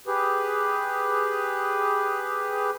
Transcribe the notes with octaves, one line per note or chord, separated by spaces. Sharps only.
G4 G#4 B4